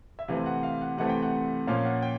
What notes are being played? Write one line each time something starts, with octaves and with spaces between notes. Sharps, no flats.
E5
C3 E3 A3 C4 F5
F#5
F5
F#5
C3 E3 A3 C4 F#5
G5
F#5
A#2 F3 A#3 C#4 F5
F#5
G5